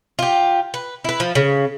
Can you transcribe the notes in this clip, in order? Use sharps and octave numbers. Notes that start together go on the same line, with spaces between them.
F4 G4
B4
E4 B4
F3
C#3